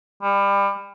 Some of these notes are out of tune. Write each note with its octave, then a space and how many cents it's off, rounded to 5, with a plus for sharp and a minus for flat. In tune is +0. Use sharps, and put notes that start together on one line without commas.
G3 +30